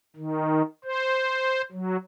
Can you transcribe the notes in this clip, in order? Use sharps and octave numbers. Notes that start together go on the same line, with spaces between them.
D#3
C5
F#3